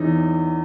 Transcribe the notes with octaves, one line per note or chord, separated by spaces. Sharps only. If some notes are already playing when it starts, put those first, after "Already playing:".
Already playing: E2 E3 C#4 D#4